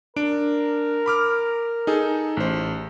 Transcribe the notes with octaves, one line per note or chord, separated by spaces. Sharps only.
D4 A#4 D7
B5 D6 F6
D#4 G#4 A4
A1 C5